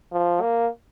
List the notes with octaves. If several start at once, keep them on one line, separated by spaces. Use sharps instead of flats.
F3
A#3